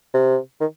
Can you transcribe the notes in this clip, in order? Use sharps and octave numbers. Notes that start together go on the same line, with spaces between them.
C3
D#3